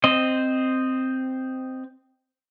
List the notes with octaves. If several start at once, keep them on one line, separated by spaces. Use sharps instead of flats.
C4 C5 D#5